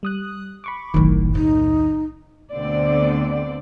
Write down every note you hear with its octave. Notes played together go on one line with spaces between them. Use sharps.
G3 D#6 F#6
B5 C#6 D6
F#1 B1 F#2 A2 D#3
D#2 D#4
D2 B2 D3 C4 D5